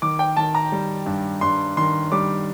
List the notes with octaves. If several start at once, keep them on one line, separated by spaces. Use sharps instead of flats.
D#3 D6
G5
D#3 A5
A#5
G3
G2
G2 C6
D#3 C6
G3 D6